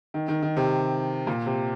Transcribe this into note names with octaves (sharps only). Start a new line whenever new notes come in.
D#3
D#3
D#3
C3
A#2
C3